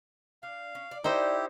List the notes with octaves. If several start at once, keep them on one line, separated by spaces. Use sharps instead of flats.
D4 F5
C#4
D5
D#4 E4 G4 C5